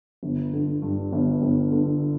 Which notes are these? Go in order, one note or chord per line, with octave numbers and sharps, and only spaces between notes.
G1
D3
G2
G1
G1
D3